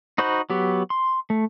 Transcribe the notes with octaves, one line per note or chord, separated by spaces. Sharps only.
D#4 F#4 C5 B5 G6
F#3 B3 G4
C6
A3